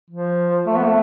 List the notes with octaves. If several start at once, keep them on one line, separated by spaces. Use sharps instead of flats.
F3
A3
B3
A3